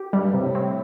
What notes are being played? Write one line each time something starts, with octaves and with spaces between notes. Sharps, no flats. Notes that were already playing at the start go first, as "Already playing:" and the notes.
Already playing: G4
G2 G3
A2 C3
C4